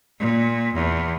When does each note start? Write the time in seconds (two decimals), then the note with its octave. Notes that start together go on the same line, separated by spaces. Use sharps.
0.19 A#2
0.74 E2